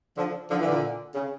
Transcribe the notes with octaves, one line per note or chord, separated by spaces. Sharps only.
D3 F3
D3 F3
E3
A#2 D3
C#3